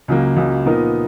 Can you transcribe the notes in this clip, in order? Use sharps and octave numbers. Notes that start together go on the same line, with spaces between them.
C#2 C#3 F#3 A#3
C#2 C#3 F#3 A#3
A#2 F3 B3 D#4 A#4